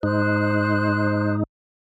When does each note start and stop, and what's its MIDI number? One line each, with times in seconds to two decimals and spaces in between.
0.03 1.43 44
0.03 1.43 63
0.03 1.34 72
0.03 1.34 90